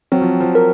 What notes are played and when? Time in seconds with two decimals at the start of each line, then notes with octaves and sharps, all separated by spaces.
0.12 F#3 C4
0.22 F3
0.40 F3
0.55 A#4